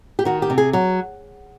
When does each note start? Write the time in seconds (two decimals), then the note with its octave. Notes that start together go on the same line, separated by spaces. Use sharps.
0.19 G4
0.25 D#3 F#4
0.42 G4
0.50 C3
0.58 G#4
0.73 F#3